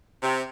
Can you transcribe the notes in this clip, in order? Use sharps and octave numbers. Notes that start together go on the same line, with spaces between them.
C3